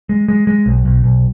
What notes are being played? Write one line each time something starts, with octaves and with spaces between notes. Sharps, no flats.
G#3
G#3
G#3
B1
B1
B1